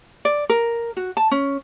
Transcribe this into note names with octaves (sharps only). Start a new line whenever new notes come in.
D5
A#4
F#4
A5
C#4